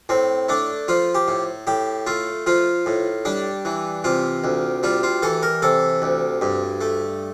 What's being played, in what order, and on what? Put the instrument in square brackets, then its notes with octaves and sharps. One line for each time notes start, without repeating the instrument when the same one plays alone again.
[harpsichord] A2 C4
A3 D4
F3 F4
G4
A2
A2 G4
A3 F4
F3 F4
A2
G3 D4
E3
C3 F4
D2
G3 F4
F4
E3 A4
A#4
C3 A4
D2
G2
A3